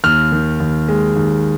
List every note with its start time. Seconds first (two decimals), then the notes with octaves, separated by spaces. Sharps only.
0.04 D#2 F6
0.32 D#3
0.60 D#2
0.88 G#3
1.16 D#2